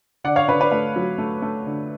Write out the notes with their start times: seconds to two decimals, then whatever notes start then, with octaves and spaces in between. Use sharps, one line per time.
0.24 D3 D5 F#5
0.36 C#5 F5
0.48 D3 B4 D5
0.60 B4 D5
0.72 A3 B4
0.96 F#3
1.18 A3
1.42 A3
1.66 D3